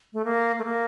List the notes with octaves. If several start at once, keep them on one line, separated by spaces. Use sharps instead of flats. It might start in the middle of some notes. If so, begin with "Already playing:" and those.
A3
A#3
A3
A#3